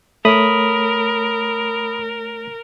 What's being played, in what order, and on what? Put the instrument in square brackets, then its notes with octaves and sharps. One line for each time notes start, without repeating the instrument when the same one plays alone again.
[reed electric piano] A3 C#5 [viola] A#4 [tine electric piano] B5 D#6